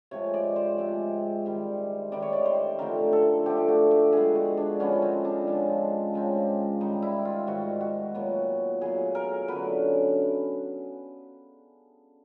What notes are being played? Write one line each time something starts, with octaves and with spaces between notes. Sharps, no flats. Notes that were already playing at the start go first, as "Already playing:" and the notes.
C3 F3 G#3 C4 C#5
D5
C5
C3 F3 G#3 C4
C3 D#3 G3
C3 D#3 G3 D5
C#5
D5
C5
D3 F3 A3 C4 A#4
A4
D3 F3 A3 C4 G4
F#4
G4
D3 F3 G#3 B3 G#4
F#4
D4
D3 F3 G#3 B3 C#4
C4
D4
C#3 F3 G#3 C4
C#3 F3 G#3 C4
G#2 D#3 G3 D#4
E4
F4
G#2 D#3 G3 F#4
F#4
A#2 F#3 B3
A#2 F#3 B3 G#4
A#4
F#2 D3 F#3 B4